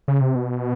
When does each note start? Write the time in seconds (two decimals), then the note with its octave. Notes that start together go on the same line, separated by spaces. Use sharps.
0.08 C#3
0.21 C3
0.35 B2